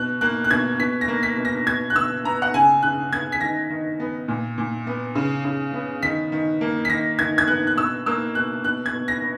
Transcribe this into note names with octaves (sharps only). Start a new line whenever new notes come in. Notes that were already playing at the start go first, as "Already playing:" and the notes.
Already playing: B2 F#6
A#3 F#6
F#6
B2 G#6
B2 B6
A#6
A#3
B6
B2
A#6
B2 G#6
F#6
B2 E6
B3 A#5
F#5
C#3 G#5
C#3 F#6
B3 G#6
B6
D#3 A#6
D#3
B3
A#2
A#2
B3
C#3
C#3
B3
D#3 B6
D#3
A#3
B6
D#3 A#6
D#3 G#6
G#6
B3 F#6
F#6
B2 E6
A#3 E6
B2 F#6
B2 F#6
G#6
B2
A#6
B3